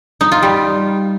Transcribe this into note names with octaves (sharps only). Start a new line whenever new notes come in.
D#4
F4
G3